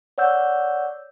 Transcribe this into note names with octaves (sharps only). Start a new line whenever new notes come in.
C#5 D5 F#5 E6 G6